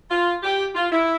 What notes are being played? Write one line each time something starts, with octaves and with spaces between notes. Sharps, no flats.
F4
G4
F4
E4